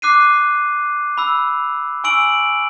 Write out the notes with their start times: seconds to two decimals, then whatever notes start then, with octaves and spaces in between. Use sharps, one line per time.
0.02 D6 F#6 C7 D#7
1.18 B5 E6
2.04 G#5 C#6 E6 D7 F#7